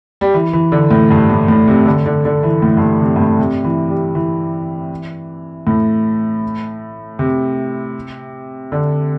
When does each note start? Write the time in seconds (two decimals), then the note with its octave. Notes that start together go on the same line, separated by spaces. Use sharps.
0.21 G3
0.34 E3
0.53 E3
0.72 D3
0.91 A2
1.10 G2
1.30 A2
1.48 A2
1.68 C3
1.86 D3
2.06 D3
2.25 D3
2.43 E3
2.62 A2
2.77 G2
2.82 A2
3.01 C3
3.16 G2
3.20 A2
3.39 C3
3.64 E3
3.90 G3
4.15 E3
5.67 A2
7.19 C3
8.72 D3